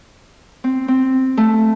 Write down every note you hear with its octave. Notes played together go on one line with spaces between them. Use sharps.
C4
C4
A3